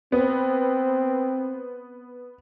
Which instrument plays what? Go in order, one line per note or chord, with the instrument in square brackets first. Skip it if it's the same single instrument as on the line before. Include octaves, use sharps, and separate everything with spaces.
[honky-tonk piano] B3 [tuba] C4